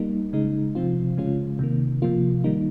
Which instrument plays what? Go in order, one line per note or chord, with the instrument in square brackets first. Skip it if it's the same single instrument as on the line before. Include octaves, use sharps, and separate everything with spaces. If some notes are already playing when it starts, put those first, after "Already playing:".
Already playing: [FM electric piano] G3 A#3 D#4
C#3 G#3 D#4
C3 F3 C4 F4
C#3 G#3 C#4 F4
C3 D#3 A#3
C3 F3 A#3 F4
D#3 G3 A#3 D#4